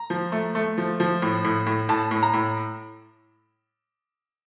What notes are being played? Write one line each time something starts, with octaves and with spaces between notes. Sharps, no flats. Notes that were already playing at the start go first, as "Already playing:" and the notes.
Already playing: A#5
F3
A3
A3
F3
F3
A2
A2
A2
A2 A5
A2
A#5
A2